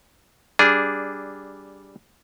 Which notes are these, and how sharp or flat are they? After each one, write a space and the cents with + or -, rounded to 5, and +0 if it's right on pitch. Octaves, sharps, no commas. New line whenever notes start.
G3 +0 D4 -10 G#4 +0